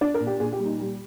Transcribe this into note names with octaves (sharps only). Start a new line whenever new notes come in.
D4 D5
A#4
A#2
G4
A#2 G#4
G4
G3
D#4
G3